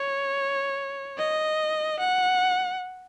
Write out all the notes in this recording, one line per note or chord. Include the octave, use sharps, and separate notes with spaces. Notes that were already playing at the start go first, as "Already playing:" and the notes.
Already playing: C#5
D#5
F#5